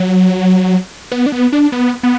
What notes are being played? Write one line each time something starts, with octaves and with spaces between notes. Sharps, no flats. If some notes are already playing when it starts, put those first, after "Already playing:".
Already playing: F#3
B3
D4
B3
D4
B3
B3